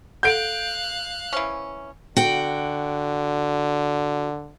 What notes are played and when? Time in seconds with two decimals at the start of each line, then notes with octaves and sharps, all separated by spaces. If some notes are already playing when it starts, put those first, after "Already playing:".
0.23 A4 F5 F#5 F#6 G6 D7
1.33 E3 C#4 C5 E5
2.17 D3 F#4 G5